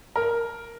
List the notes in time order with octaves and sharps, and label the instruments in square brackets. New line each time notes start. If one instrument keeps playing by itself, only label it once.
[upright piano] A#4